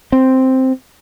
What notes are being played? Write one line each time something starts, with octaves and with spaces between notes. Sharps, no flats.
C4